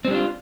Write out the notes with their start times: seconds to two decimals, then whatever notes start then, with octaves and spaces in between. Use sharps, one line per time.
0.05 C4
0.08 G3
0.11 D4
0.15 F4